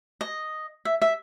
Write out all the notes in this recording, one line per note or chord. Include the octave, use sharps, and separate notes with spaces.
D#5
E5
E5